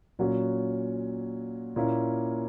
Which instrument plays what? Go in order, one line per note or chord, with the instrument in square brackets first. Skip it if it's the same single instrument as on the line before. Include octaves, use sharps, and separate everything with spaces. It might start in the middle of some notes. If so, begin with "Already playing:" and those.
[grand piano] A#2 F#3 C#4 F#4
A#2 A#3 C#4 E4